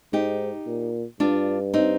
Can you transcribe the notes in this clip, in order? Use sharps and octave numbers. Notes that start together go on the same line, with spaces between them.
G#2 D#4 G4
A#2
G2 D4 F4
C4 D#4